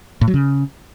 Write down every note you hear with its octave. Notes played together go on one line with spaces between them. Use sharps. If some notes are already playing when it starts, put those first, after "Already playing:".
A2
F#3
C#3